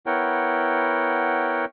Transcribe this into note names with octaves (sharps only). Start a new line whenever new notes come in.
B3 E4 A#4 C#5 F#5 G5